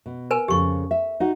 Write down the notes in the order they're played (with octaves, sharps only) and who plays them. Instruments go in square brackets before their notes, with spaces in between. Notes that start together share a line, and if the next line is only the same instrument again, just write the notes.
[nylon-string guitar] B2
[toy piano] A#4 B4 G#5
[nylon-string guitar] F2 C#3 A4 [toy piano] G4 C#6
[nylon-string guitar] E5
D#4 F#4 F#5